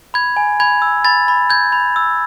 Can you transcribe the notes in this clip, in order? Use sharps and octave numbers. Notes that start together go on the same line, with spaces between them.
B5 G#6
G#5
B5 G#6
E6
B5 A6
B5
G6 G#6
B5
E6